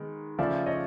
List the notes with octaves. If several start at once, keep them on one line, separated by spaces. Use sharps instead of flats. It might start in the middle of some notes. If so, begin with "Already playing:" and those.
Already playing: D#3 G#3 B3
C#3 F3 A3 C#4 D5 E5
C#5 D#5